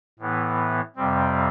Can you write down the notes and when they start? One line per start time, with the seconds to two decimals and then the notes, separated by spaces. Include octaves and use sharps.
0.19 A2 E3 B3
0.96 F2 C3 G3 C4